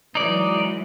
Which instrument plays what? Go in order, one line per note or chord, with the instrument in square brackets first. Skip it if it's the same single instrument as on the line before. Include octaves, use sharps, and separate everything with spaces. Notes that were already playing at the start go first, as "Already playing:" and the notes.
[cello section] E3 F#3 G#3 [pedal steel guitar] D#4 D5